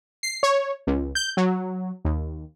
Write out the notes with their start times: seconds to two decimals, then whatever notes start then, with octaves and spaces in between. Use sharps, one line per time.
0.23 C7
0.43 C#5
0.87 C#2
1.15 G6
1.37 F#3
2.05 D#2